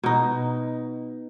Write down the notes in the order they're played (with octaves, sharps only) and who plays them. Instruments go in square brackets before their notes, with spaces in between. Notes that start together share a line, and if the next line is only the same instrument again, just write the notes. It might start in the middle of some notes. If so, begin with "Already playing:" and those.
[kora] B2 D#4